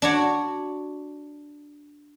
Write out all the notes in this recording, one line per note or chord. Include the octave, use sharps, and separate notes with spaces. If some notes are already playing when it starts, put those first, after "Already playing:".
D4 F#4 C#5